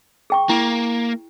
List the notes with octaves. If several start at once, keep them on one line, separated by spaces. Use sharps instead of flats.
G#4 G5 C#6
A#3 E4